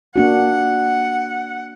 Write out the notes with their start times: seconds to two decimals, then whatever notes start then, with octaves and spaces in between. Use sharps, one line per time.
0.16 A#3 D4 F#4 F#5